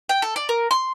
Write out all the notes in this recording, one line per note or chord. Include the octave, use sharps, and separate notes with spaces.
G5
A4
D5
A#4
C6